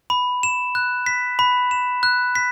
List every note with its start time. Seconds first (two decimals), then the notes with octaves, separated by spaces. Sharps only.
0.10 B5
0.43 E7
0.75 F#6
1.06 B6
1.39 B5
1.71 E7
2.03 F#6
2.35 B6